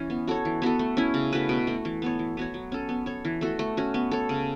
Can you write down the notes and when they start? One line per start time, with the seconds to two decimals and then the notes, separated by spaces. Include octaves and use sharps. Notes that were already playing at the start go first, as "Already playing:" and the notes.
Already playing: E3 C#4
0.10 B3
0.28 F#4 A4 C#5
0.45 E3
0.62 B3 F#4 A4
0.79 A3
0.97 C#4 E4
1.14 C#3
1.33 A3 F#4 B4
1.49 B2
1.67 A3 F#4
1.85 E3
2.02 B3 A4 C#5
2.19 E3
2.37 B3 F#4 C#5
2.54 F#3
2.72 C#4 A4
2.89 B3
3.06 A4 C#5
3.25 E3
3.41 A3 F#4 A4
3.59 A3
3.77 C#4 F#4
3.94 B3
4.11 A4 C#5
4.29 C#3